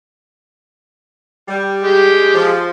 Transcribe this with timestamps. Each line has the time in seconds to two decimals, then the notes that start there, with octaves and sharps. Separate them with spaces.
1.48 G3
1.83 G#3 G4
2.35 F3